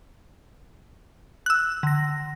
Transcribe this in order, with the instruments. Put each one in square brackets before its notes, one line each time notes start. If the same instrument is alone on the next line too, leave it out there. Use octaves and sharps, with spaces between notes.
[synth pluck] E6 F#6
[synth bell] D3 A#6